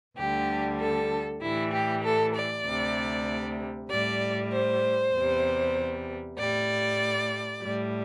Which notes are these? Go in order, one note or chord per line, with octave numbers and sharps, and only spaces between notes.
D2 D3 G3 G4
A4
A2 E3 G3 E4
G4
A4
D5
D2 C3 G3
A2 G3 D5
C5
E2 C3 G3
A2 G3 D5
A2 G3